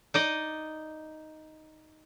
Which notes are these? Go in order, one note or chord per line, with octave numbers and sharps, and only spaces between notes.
D#4 D5 D#5